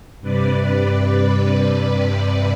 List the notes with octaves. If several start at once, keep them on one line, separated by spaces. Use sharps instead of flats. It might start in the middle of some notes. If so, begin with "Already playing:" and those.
G2 C3 B4 D5